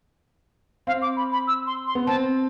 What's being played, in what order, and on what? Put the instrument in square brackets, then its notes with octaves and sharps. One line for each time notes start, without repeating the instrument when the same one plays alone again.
[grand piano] C4 [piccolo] F5
[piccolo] D6
B5
B5
E6
C6
C6
[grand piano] B3
[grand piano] C4 [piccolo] A5